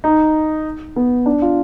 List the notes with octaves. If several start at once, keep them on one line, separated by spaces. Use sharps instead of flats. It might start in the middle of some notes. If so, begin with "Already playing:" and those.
D#4
B3
D4
F4